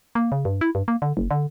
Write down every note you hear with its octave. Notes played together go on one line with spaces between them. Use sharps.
A#3
C#3
G2
E4
G2
A#3
D3
F#1
D3